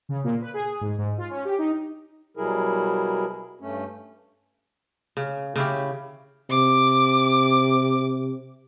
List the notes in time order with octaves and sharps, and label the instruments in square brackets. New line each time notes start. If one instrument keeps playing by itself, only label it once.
[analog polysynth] C#3
A#2
B4
G#4
G#2
G#2
F4
C#4
G4
D#4
[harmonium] B2 F#3 G3 E4 G#4 A#4
G2 A3 C#4
[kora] C#3
C#3 E4 G4
[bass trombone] C3 [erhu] D6